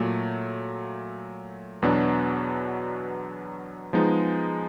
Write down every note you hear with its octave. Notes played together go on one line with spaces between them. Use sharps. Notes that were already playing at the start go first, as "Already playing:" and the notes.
Already playing: A#2 F#3 A3
E2 B2 F#3 B3 D4
F3 G#3 B3 D#4